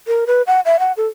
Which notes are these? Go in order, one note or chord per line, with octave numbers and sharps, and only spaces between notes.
A#4
B4
F#5
E5
F#5
A4